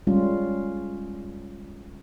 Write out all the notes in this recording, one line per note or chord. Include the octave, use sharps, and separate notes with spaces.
G3 G#3 C#4 F4